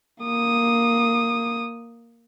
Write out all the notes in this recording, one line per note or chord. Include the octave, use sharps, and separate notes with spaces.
A#3 D#6